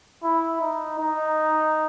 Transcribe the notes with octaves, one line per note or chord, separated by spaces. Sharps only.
E4
D#4
D#4